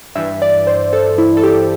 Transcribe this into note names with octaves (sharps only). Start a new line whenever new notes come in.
G2 E3 E5
D5
C5
A4
E4
A4
G4